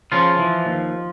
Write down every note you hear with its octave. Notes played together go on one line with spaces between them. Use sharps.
C#3 F3 F4
E3
D#2